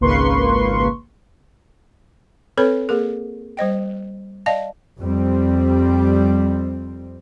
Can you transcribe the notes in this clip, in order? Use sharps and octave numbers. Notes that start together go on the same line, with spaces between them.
G#1 C#2 A#3 B4 C6 C#6
C4 A4 B4 C#5 B5
A#3 G#4 A#4
G3 C5 D#5 G5
D5 D#5 F5 A5
F2 G3 C4